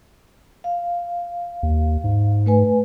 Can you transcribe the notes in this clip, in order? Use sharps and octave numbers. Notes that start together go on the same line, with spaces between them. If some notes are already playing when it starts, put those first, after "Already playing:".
F5
D#2
G#2
A3 B4 G#5